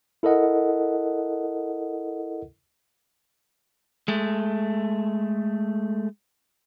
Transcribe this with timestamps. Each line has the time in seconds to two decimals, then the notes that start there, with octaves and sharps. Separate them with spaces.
0.23 E4 A4 A#4 D#5 F#5
4.08 G#3 A3